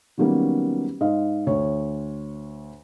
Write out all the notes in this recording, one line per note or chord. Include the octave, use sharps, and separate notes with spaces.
D#3 F#3 G3 A#3 B3 C#4
G#2 D#5 F5
D2 C#5